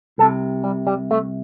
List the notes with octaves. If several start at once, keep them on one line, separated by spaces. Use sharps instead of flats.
C2 C3 A4
G3
G3
A3